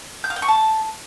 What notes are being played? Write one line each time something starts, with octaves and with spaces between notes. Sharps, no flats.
G6
F5
G5
C#6
A5